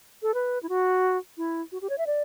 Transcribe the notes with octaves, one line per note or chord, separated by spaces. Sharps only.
A4
B4
E4
F#4
E4
F#4
G4
C#5
E5
D5